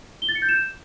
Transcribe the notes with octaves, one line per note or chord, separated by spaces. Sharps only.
G7
A6
C#7
G6
E7